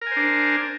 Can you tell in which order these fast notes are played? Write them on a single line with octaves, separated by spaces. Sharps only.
A#4 G#5 C5 D4